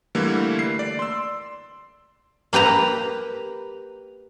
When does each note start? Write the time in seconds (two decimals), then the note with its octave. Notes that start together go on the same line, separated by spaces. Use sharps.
0.15 D3 E3 G3 A3 A#3
0.59 C7
0.79 D5
0.99 C6 E6
2.53 A#3 G4 B4 A#5